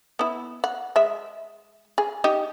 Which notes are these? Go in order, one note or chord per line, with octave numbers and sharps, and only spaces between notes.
B3 E4
F#5
G#3 E5
G#4
D#4 G4 D#5